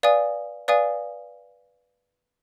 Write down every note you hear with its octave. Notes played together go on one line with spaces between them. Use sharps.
B4 D5 F5 G#5 D#6
B4 D5 F5 G#5 D#6